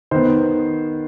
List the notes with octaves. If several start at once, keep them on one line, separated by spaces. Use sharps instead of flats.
D#3 B3 C5